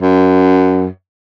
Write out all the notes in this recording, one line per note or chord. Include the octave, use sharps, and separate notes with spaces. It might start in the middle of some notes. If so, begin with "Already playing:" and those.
F#2